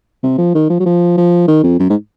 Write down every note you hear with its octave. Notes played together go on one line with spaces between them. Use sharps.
C3
F3
D#3
F3
F#3
F3
F3
D#3
F2
F#2
G#2